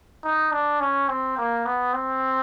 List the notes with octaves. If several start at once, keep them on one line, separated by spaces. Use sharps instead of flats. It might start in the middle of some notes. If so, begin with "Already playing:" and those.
D#4
D4
C#4
C4
A#3
B3
C4